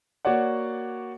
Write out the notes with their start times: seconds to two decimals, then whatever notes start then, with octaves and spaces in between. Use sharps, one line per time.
0.25 A#3 F#4 C#5 D5 F#5